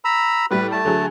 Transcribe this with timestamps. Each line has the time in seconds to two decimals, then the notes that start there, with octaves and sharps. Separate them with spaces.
0.05 A#5 B5 E6
0.51 A2 G3 E4 B4
0.72 A3 A5
0.85 D3 F#3 G#4